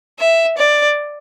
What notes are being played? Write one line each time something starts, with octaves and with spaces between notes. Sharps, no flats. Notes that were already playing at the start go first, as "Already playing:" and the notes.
E5
D5